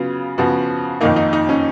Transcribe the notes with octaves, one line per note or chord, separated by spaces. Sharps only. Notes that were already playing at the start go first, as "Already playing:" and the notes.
Already playing: C#3 F#3 B3 F4
C#3 F3 B3 F#4
F2 D#3 A#3 D#4
D#4
D#4
C#4